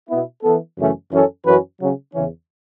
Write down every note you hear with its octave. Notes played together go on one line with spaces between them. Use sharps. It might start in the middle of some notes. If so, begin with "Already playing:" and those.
B2 B3 E4
E3 B3 A4
F#2 C#3 E3 A3 C#4
F#2 E3 C#4 A4
F#2 E3 C#4 F#4 B4
C#3 F#3 C#4
E2 C#3 E3 C#4